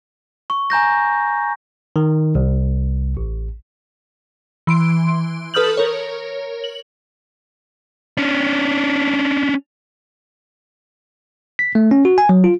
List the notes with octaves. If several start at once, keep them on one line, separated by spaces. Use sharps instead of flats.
C#6
G#5 A#5 G6 A#6
D#3
C2
A1
E3 C6 D7
A4 B4 D#6 F6 G6 F#7
A#4 C#5
F#7
C#4 D4
B6
A3
C#4
F#4
G#5
F#3
F4